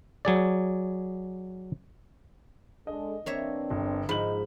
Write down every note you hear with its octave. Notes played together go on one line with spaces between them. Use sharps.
F#3 G#4 D5
G#3 D4 A4 D#5
E3 A#3 C4 D4 C#5 E5
G1
G#2 F3 D#4 B5 F#7